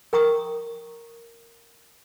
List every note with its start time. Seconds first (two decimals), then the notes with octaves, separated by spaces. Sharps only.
0.13 A#4 G5 A#5 C#6 D#6